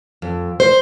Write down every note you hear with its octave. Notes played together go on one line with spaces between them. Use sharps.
F2
C5